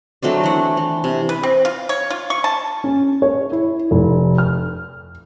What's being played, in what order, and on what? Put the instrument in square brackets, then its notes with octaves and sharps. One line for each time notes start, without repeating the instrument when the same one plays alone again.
[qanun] F#3 A3 C4 D4
E3 F#5
E3
C3
[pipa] B4
C4
F4
C#5
F4
C#6
A5
[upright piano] C#4
C#5
E4
F1
F6